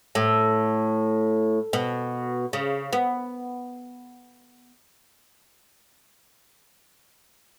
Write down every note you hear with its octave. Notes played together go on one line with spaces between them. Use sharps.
A2
B2
C#3
B3